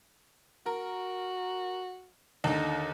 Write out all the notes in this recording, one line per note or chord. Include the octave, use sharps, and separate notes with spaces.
F#4 A#4
D#2 D3 D#4